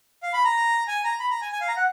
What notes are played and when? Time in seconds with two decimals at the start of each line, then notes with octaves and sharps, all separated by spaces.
0.23 F5
0.33 B5
0.45 A#5
0.88 G#5
1.04 A#5
1.20 B5
1.31 A#5
1.42 G#5
1.52 G#5
1.61 F5
1.68 A#5
1.76 F#5